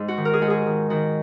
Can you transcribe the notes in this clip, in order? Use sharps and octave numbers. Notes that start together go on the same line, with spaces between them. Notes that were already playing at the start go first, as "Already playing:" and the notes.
Already playing: G#2
F#4
D#3
A#4
G#4
G#2 F#4
G#4
D#3
D#3 F#4